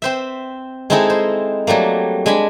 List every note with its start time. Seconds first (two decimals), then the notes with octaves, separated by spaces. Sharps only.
0.02 C4 C5 E5
0.90 G#3 C4 D#4 E4 G#4 A4
1.10 C5
1.67 F#3 G3 A3 A#3
2.26 G#3 D4 G#5 B5